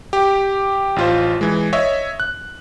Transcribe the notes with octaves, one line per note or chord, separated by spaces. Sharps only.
G4
A1 F4 C5
E3 G#3
C#5 D#5 E5
F#6